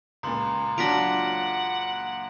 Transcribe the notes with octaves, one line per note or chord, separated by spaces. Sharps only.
C#2 A#2 A#5 C6
F#3 D4 F4 F#5 A#6 B6 D7